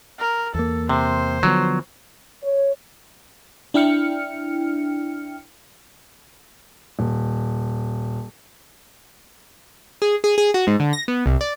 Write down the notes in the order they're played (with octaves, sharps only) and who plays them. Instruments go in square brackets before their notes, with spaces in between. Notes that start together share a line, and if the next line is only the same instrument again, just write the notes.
[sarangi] A#4
[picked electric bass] E2 A#3 [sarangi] A4
[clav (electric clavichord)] C3 [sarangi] C5
[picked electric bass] D3 F3 B3 [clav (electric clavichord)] F#3
[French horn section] C#5
[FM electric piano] D4 E4 G5 F6 C#7
[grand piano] D#1
[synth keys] G#4
G#4
G#4
F#4
G#2
D3
A#6
B3
C2
D5